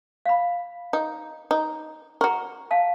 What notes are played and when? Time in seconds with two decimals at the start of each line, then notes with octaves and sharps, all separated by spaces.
0.26 F5 B5
0.93 D#4
1.51 D#4
2.21 F#4 A#4 C#6
2.71 F5 F#5 A5